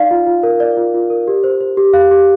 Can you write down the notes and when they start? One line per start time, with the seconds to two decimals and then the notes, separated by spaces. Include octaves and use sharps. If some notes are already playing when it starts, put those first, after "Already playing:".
Already playing: D#4 D5 F5
0.11 F4
0.27 F4
0.43 A#4
0.60 D5
0.77 F4
0.94 F4
1.10 A#4
1.28 G4
1.44 C5
1.61 C5
1.77 G4
1.93 G4 F5
2.11 G4